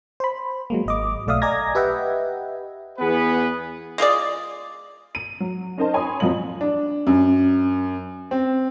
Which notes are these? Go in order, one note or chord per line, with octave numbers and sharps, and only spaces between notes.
C5 B5
F#3 G#3 A#3
G#1 D#5 D6
B1 A3 D5 E5 F5 D#6
D5 D#5 G#5 A#5 G#6 A#6
G4 B4 D#5 E5 F#5 G5
E2 B3 G#4 B4
G#3 F4 G#4 D5
D#7
F#3
C#4 D#4 A#4 C5 D#5 A5
C#5 G#5 B5 C6 D#6
F2 A#2 F#3 F4 D#5 F#7
D4
F#2
C4